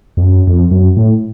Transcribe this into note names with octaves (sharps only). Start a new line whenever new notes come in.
F2
F#2
F2
F#2
A2